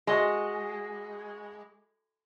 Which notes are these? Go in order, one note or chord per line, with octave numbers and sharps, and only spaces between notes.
G#3 F#4 D#5 C6